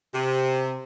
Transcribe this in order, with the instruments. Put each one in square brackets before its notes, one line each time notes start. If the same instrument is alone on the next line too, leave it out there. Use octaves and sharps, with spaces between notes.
[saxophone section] C3